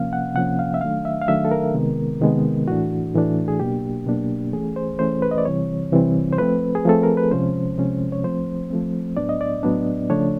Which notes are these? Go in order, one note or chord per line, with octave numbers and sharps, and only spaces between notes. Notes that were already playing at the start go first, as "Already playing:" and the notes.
Already playing: C3 F3 A#3 C#4 F5
F#5
C3 F3 A#3 C#4 F#5
F5
E5
D#3 F#3 A3 D4 F5
E5
F5
D#3 F#3 A3 D4 E5
A4
A#4
C3 D#3 G#3 B3
C3 D#3 G#3 B3
A2 E3 A3 D4 F#4
A2 E3 A3 D4
G#4
B2 F#3 A#3 D4 G4
B2 F#3 A#3 D4
E3 A3 C#4 G#4
C5
E3 A3 C#4 C5
B4
D#5
D5
C3 E3 G3 C4 C#5
C3 E3 G3 C4
C5
F3 A3 C4 B4
G#4
F3 A3 C4 A4
A#4
B4
C3 F3 G#3 C#4 C5
C3 F3 G#3 C#4
C#5
F3 A3 C4 C5
F3 A3 C4
A2 F#3 B3 D4 D5
D#5
D5
A2 F#3 B3 D4
C#3 F3 A3 D4 C#5